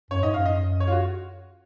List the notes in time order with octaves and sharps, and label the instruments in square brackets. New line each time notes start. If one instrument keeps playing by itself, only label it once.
[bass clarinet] F#2 [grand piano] C#5
[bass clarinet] G#2 [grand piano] D#5
[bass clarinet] F#2 [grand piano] F5
[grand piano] D#5
C#5
F4
F#4